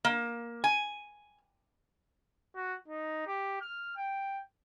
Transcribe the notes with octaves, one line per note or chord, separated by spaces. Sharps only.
A#3
G#5
F#4
D#4
G4
F6
G5